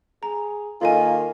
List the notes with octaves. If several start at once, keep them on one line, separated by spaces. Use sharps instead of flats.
G#4 A#5
D#3 A#3 F4 A4 D#5 G#5